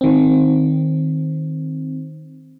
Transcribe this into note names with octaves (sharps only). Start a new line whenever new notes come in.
D#3 C4